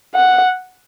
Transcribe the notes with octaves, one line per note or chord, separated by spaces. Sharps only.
F#5